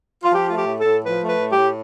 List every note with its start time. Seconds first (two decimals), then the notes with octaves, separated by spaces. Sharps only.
0.23 F4
0.32 F3 G4
0.48 A3 F4
0.56 G4
0.67 A2
0.79 A4
0.85 A2
1.04 F3 B4
1.21 A3
1.28 B4
1.39 A2
1.51 G4
1.57 A2